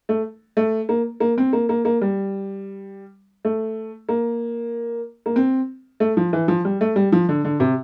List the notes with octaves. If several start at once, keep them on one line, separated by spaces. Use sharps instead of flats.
A3
A3
A#3
A#3
C4
A#3
A#3
A#3
G3
A3
A#3
A#3
C4
A3
F3
E3
F3
G3
A3
G3
F3
D3
D3
C3